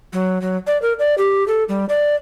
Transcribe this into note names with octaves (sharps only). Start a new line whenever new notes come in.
F#3
F#3
D5
A#4
D5
G4
A4
G3
D5